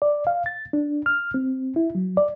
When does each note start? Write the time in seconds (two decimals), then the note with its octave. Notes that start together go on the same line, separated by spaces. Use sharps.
0.02 D5
0.27 F5
0.46 A6
0.73 D4
1.06 F6
1.34 C4
1.76 E4
1.95 F#3
2.17 D5